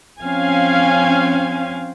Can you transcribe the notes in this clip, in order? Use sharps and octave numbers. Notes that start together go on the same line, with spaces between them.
F3 C4 C#4 F5 G#5